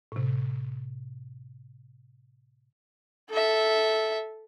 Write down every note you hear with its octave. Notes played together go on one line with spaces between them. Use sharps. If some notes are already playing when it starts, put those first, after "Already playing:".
A2 C3
A4 E5